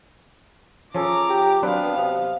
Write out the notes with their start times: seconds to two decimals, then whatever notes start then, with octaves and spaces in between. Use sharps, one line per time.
0.95 F3 C#4 G#4 A4 A#5 D6
1.30 G4
1.63 F#3 B3 C4 D4 B4 F5
1.97 C3